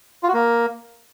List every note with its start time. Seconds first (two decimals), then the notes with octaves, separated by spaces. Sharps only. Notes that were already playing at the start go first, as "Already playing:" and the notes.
0.23 F4
0.28 F#4
0.34 A#3